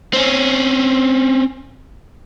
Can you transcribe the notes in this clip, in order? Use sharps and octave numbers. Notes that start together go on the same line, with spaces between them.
C4 C#4